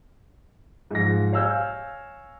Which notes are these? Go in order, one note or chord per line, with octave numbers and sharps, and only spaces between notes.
G#2 F3 A#6
C#5 F5 G#5 E6 F6 G6